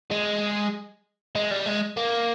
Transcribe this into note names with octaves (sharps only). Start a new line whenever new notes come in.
G#3
G#3
G3
G#3
A#3